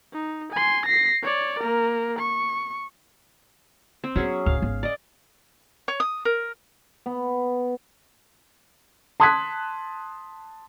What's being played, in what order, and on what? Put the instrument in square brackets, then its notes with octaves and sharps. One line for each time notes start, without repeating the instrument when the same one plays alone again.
[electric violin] D#4
G#5 C6
A#6 C7
C#5 D5
A#3 A#4
C#6
[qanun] C4
[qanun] F#3 C#4 G#4 [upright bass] B3
[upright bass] D1 [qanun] F5
[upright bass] G#1 B3
[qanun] D5 D#5
[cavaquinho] C#5
D#6
A#4
[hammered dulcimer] B3
[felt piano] A5 C6 D#6 F#6 G#6 B6